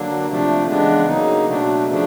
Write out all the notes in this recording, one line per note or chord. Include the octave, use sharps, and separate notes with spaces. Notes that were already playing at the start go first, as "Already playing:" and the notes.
Already playing: D3 F#3 A#3 D4
C3 F3 A3 D4
C#3 E3 G#3 B3 D4
C#3 F#3 A#3 D#4
B2 F#3 A3 D4
C#3 F3 A3 D4